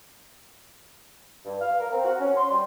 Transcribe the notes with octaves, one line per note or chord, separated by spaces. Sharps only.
G2
F5
A#4
C4
F#4
C#4
C6
G3